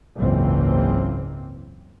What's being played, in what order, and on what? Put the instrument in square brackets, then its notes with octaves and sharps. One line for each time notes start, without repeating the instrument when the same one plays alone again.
[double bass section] F#1 C#2 G#2 E3 A#3 C4